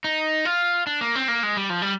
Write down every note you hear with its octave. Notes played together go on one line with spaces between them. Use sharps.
D#4
F4
D4
A#3
C4
A#3
G#3
G3
F3
G3